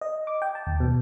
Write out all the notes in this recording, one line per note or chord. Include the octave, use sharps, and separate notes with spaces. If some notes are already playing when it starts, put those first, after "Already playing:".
D#5
D6
G5
A5
D#2
B2